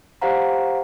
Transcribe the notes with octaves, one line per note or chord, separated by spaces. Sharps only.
G4 C5 D5 F5 F#5 A#5